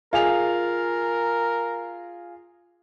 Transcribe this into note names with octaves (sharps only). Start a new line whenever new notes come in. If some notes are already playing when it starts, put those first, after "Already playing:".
F4 G#4 A#4 F7